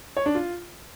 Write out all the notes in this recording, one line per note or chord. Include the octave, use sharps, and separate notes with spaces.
C#5
D4
F4